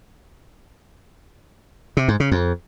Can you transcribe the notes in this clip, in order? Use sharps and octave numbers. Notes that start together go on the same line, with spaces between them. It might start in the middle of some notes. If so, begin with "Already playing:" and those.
C3
G#2
C#3
F2